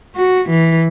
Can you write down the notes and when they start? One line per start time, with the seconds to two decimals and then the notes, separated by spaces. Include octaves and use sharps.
0.16 F#4
0.50 E3